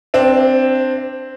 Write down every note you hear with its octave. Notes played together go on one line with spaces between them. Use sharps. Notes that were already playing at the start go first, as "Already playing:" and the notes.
C4 D4